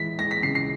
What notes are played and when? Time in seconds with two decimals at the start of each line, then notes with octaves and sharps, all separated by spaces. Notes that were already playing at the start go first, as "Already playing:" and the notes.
Already playing: E3 G#3 B6
0.18 G#3 A#6
0.31 B6
0.43 C#3 C7
0.55 C7